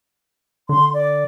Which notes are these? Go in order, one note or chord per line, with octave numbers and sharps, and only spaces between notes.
D3 C6
D5